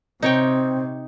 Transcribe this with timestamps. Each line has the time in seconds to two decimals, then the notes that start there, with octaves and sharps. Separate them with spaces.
0.22 C3 C4 D#4 C#5 G5